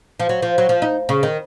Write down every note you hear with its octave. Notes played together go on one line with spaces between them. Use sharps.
F3
F#3
F3
F#3
F3
D#4
C#3
D#3